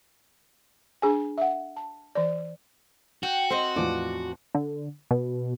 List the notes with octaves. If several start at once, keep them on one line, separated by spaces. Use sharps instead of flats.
D4 G#4 G#5
E5 F#5
A5
E3 D5
F#4 G5
A3 A#3 C4 C5 D#5
E2 A2 F3 D5
D3
B2